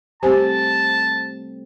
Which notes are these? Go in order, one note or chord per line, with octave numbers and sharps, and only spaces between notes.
G3 A3 C4 G4 C5 G#5 A5